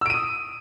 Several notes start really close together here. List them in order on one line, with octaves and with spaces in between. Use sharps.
E6 D7 D#7 D#6